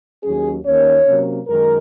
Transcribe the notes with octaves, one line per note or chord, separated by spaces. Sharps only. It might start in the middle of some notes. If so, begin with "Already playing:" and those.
D#2 D#3 F#3 C#4 G#4
D#2 D#3 A#3 C#4 C#5
C3 F#3 A#3 C#4
F#2 D#3 G#3 A#4